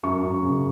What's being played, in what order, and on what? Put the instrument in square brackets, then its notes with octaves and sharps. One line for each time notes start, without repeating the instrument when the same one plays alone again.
[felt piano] F#2 C#6
F#2
C#3